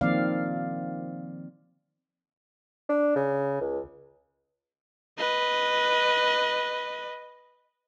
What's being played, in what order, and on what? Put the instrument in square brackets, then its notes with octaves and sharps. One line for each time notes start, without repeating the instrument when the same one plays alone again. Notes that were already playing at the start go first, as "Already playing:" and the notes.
[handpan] D#3 F3 A#3 C4 D5 F5
[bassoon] D4
C#3
C#2
[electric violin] B4 D#5